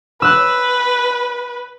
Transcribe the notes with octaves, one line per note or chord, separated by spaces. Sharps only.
B4 E6 F#6